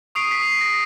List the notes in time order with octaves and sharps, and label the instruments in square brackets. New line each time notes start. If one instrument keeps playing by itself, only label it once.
[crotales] C#6 D#6 C7 D7
B6
A#6